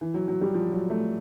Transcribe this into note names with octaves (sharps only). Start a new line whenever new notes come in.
E3
F#3
F#3
G3
F3
F#3
A3